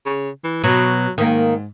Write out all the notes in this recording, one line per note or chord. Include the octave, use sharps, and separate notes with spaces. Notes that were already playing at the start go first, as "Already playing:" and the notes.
C#3
E3
B2 F#3
G#2 D#3 A#3